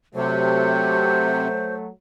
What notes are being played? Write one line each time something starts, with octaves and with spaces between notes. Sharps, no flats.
C3 F#3 A3 C5